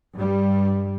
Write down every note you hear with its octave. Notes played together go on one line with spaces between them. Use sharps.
G2 G3